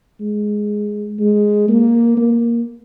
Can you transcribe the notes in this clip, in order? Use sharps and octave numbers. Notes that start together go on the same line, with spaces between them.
G#3
G#3
A#3
A#3